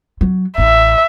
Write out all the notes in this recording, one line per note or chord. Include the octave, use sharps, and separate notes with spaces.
F#3
A1 E5